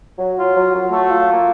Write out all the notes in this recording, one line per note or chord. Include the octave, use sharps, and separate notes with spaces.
F#3
F4
F#3
F#3
A3
F4
A#3